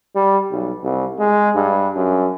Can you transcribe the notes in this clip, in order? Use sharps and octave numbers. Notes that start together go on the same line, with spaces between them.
G3
B1
C2
G#3
G2
F#2